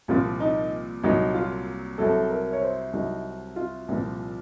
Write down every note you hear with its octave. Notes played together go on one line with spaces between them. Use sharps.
C2 A#2 F3 F4
D#4
C2 A#2 F#3 D#4
F4
C2 C3 F#3 A4
A#4
C#5
C5
C2 C3 F#3 D#4
F4
C2 A#2 F3